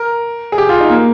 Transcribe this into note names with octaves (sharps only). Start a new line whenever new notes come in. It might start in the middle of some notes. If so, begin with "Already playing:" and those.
Already playing: A#4
G#4
G4
F4
D#4
A#3